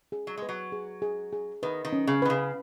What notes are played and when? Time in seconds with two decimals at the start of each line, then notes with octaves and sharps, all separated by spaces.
0.12 G#4
0.27 F#3
0.37 G#3 B4
0.49 F#3
0.72 G#4
1.02 G#4
1.33 G#4
1.63 D#3 B4
1.85 D#3
1.93 C#4
2.07 C#3
2.22 D#3 B4
2.30 C#3